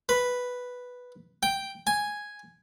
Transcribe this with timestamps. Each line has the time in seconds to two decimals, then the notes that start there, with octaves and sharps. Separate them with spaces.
0.09 B4
1.43 G5
1.87 G#5